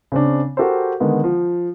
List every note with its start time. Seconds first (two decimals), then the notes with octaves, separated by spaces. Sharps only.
0.12 C#3 C4 D4
0.57 F#4 G4 A4 A#4 C5
1.00 D3 D#3 G#3 B3
1.24 F3